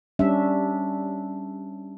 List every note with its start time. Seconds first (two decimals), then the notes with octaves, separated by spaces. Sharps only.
0.19 G3 C#4 D4 E5